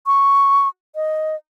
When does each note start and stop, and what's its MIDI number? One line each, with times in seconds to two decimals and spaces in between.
0.06 0.68 85
0.95 1.36 75